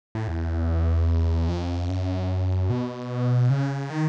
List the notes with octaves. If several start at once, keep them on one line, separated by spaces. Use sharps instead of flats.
A2
E2
F2
F#2
B2
C#3
D#3